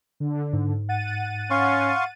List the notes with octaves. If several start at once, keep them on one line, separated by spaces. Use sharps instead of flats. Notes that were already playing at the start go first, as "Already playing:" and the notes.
D3
G#2
F#5 A6 D#7
C#4 F5 C6 C#6